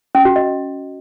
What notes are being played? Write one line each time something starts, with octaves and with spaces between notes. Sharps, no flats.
C#4
F#4
D#5